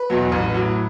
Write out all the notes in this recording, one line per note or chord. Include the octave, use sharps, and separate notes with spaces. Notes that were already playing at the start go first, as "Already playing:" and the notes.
Already playing: B4
E2 B2 F#3
A1
A2 F#3